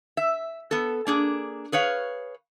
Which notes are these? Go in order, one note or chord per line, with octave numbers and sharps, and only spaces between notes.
E5
B3 A4
A#3 D4 G#4
G#4 B4 C#5 F5